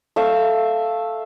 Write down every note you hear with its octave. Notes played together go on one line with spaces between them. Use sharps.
A3 E5 F5